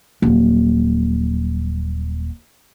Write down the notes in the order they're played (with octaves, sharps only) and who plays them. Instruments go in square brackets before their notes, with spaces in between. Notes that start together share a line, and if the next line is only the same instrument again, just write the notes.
[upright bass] D#1 F#3